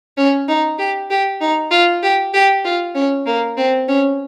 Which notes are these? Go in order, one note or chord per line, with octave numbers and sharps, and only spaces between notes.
C#4
D#4
G4
G4
D#4
F4
G4
G4
F4
C#4
A#3
C4
C#4